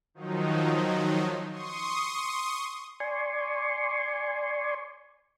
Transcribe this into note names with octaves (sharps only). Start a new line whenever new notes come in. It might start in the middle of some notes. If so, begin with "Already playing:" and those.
D#3 F3 F#3 D#4
C6 C#6 D#6
D5 G#5 C6 C#6